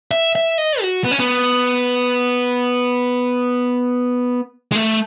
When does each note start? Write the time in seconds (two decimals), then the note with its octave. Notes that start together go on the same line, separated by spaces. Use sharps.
0.11 E5
0.35 E5
0.58 D#5
0.81 F#4
1.04 B3
1.11 C#4
1.20 B3
4.72 G#3
4.75 A3